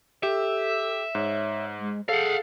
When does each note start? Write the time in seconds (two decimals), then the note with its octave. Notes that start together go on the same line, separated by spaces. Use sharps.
0.23 G4 A4 E5
1.15 G#2 C#5
1.79 G#3
2.09 G#4 A4 F5 F#5